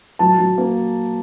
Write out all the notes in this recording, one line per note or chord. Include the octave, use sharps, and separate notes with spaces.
F#3 A5
F#3
A#3